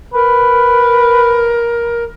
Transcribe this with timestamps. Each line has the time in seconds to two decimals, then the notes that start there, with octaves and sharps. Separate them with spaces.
0.14 A#4 B4